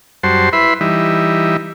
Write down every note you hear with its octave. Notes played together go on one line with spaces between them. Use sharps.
F#2 G3 F#4 C5 A5 C6
E4 B4 E5 B5 C6
E3 G3 D#4 E5